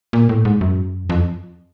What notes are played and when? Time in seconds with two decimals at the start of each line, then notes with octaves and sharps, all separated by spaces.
0.13 A#2
0.29 A2
0.45 G#2
0.61 F#2
1.10 F2